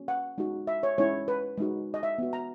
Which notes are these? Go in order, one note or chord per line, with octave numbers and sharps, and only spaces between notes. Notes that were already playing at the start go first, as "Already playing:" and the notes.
Already playing: A#3 C#4 F#4
F#5
G#3 D#4 F#4
E5
C#5
G#3 C#4 E4 C#5
B4
G#3 D#4 F#4
D#5
E5
B3 F#4
A#5